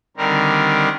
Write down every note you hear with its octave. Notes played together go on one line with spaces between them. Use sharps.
D3 D#3 G3 C4 A#4